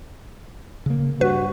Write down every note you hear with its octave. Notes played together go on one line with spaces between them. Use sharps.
C#3 A#3
G2 F#4 B4